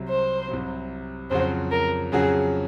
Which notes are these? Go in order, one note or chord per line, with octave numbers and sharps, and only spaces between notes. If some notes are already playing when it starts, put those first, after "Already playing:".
Already playing: C2 C3 F#3
C5
C2 C3 F#3
F2 C#3 F#3 C#4 F#4 C5
A#4
F2 C#3 F#3 C#4 F#4 G#4